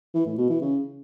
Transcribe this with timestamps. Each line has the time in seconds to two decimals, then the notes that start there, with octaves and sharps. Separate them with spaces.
0.15 E3
0.26 A2
0.38 B2
0.50 E3
0.61 C#3